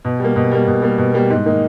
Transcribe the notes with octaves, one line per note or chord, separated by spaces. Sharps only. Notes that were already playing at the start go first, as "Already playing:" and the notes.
B2
G3 A#3
B2
G3 A#3
B2
G3 A#3
B2
G3 A#3
G#2
D#3 A#3 D#4